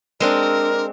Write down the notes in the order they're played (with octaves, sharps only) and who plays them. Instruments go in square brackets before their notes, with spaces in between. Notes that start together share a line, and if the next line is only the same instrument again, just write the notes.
[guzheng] G#3 C4 D4 [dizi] A#4